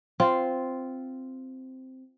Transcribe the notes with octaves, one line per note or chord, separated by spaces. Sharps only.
C4 F4